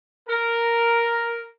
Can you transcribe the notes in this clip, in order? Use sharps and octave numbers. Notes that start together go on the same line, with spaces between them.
A#4